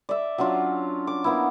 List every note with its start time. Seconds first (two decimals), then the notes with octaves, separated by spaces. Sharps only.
0.09 D5 E5
0.38 F#3 C#4 D4 F4
1.07 D6
1.24 A#3 B3 E4